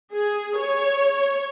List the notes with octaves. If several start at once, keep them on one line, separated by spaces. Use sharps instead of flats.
G#4
C#5